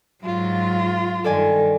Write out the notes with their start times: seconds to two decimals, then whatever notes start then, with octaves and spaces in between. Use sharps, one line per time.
0.24 G#2 F#3 F4
1.24 G2 D#3 A4 D5 G#5